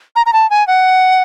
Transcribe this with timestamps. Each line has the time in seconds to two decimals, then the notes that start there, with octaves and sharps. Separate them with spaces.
0.16 A#5
0.26 A#5
0.33 A5
0.50 G#5
0.67 F#5